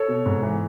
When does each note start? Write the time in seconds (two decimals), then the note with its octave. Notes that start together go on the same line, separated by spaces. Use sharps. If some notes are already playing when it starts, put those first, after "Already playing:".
Already playing: A4 C#5
0.08 B2
0.26 G#2
0.43 E3